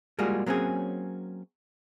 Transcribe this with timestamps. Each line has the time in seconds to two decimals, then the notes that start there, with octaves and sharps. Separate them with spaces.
0.19 G3 G#3 A#3 F4 F#4 G#4
0.46 F#3 A#3 C4 C#4 G#4